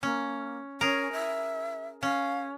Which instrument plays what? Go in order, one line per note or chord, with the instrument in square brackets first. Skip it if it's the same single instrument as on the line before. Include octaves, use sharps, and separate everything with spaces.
[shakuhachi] A#3 [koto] C#4
[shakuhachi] C#4 [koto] G#4 A#4
[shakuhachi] E5
[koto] C#4 [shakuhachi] F5